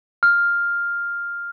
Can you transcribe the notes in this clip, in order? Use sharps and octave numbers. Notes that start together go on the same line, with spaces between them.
F6